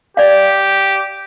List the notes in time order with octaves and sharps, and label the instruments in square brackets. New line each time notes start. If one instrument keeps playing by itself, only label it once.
[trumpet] G4 [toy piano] D5 F5